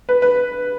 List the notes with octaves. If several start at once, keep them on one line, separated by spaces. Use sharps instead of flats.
B4
B4